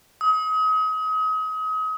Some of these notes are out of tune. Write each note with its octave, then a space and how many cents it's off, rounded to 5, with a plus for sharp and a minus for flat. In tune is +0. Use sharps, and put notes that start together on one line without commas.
D#6 +35